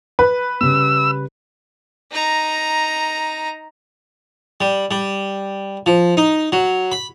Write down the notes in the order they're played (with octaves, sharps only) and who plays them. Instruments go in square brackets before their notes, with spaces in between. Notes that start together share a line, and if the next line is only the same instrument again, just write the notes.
[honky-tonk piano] B4
[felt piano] C#3 G3 [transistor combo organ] E6
[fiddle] D#4 A#5
[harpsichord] G3
G3
F3
D#4
F#3
B5